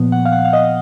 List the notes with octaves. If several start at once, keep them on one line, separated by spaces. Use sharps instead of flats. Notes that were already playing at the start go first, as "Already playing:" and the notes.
Already playing: A#2 F3 B3
F#5
F5
F#5
F5
D#5